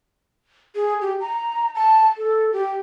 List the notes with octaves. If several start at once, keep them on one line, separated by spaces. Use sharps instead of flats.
G#4
G4
A#5
A5
A4
G4